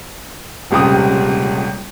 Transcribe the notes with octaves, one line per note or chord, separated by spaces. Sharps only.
D#1 C#2 C3 D#6